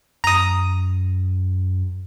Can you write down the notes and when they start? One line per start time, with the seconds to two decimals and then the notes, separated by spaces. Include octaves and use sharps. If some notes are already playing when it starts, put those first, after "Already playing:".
0.24 F#2 A#5 D#6